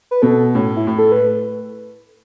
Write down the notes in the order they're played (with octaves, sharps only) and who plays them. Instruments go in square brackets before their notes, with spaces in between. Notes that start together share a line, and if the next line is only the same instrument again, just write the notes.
[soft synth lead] B4
[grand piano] B2 [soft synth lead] A4
[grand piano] A2 [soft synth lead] C#4
[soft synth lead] E4
[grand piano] A2
[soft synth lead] A4
B4